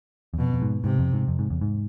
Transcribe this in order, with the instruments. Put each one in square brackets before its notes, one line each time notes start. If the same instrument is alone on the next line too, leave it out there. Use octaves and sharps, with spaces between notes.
[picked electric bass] E2
[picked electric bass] F2 [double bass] B2
[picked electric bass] F2
G#2
[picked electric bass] G#2 [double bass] C3
[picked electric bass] F2
G#2
F2
G#2
E2
G#2